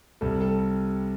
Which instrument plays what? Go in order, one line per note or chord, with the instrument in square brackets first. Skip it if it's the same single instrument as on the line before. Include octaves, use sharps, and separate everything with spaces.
[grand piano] C2 C3 G3 A4
A4